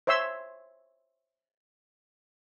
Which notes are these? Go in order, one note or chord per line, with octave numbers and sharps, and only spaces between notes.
C5 C#5 E5 C6 E6